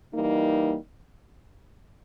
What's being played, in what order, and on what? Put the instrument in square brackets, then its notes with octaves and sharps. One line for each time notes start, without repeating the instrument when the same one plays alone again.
[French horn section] E3 G3 A#3 D#4